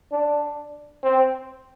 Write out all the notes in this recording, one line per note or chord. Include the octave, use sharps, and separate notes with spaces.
D4
C4